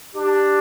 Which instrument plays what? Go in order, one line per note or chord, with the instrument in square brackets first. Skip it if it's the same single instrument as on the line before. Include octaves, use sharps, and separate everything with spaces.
[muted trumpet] D4 [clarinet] G4